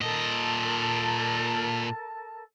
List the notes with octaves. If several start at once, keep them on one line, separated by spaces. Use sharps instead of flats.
A#2 A4 A#4 D#5 A5